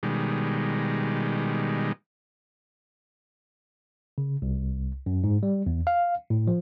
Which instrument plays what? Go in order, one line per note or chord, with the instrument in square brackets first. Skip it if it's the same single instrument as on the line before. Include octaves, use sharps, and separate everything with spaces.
[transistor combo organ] B2 D#3 G3 G#3
[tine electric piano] C#3
C2
F#2
G#2
G3
E2
F5
A2
F3